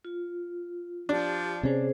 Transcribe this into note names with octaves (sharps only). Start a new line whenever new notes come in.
F4
F3 D4 G4
C3 C#4 G#4 C5